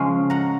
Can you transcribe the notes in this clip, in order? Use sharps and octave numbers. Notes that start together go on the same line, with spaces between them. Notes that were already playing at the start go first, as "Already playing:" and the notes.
Already playing: C#3 F3 G#3 C#4 F5
F#5 A#5